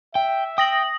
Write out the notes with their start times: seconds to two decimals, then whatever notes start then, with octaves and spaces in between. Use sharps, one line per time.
0.15 E5 G5
0.58 G5 D#6 A#6 F#7